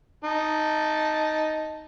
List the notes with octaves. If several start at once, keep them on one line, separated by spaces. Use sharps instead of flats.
D#4 A5